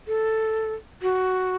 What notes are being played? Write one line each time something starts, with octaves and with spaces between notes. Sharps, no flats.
A4
F#4